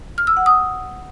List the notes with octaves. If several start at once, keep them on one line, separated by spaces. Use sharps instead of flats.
F6
E6
F#5
D#6